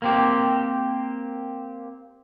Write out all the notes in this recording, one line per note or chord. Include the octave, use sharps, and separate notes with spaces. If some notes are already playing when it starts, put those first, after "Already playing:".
A#3 C4 G4